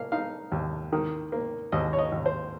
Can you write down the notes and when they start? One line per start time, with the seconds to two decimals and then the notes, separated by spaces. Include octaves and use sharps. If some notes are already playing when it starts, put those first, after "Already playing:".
Already playing: A#3 F5
0.12 D#4 F5
0.52 D#2
0.93 D#3
1.32 A#3
1.72 D#2 D#5
1.93 C#5
1.99 D#5
2.12 D#2
2.26 C5